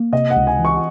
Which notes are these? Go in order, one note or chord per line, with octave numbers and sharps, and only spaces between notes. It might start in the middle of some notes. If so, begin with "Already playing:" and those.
Already playing: A#3
C3 D#5
F#5
C#2
G#5
E3
C#6